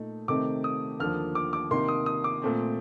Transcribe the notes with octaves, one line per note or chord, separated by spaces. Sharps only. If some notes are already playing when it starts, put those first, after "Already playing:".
Already playing: A#2 A3 D#4
C3 D#3 A3 C4 D#4 D6
D#6
D#2 D3 F3 A#3 F6
D6
D6
C3 D#3 A#3 D#4 C6
D#6
D#6
D6
A#2 A3 C4